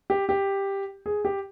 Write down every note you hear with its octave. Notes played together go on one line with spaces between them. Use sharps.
G4
G4
G#4
G4